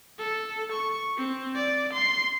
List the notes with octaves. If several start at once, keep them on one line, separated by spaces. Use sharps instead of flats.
A4
C#6
C4
D5
C6